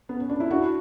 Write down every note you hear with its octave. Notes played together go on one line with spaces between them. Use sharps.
B3
C#4
D4
E4
D4 F#4